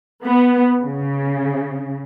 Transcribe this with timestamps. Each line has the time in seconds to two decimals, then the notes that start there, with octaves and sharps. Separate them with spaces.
0.25 B3
0.82 C#3